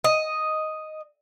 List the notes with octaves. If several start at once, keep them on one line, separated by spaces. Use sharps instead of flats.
D#5